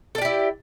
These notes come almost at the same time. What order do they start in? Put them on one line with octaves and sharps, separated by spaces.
A4 D5 G4 E4